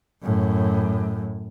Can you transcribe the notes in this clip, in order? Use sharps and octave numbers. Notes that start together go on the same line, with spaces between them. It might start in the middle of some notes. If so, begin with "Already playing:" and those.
F#2 A2